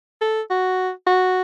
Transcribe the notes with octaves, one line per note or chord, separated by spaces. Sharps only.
A4
F#4
F#4